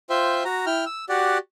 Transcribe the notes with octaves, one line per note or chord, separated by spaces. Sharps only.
F4 C5 E5 G5
F#4 A#5
E4 G5 F6
E6
F#4 G4 D5 F#5